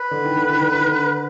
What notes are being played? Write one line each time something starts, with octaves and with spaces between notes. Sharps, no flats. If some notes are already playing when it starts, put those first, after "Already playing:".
Already playing: B4
D3
D#3
D3
D#3
D3
D#3
D3